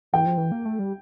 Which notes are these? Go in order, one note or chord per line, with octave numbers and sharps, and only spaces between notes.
E3 G5
F3
E3
A#3
A3
G3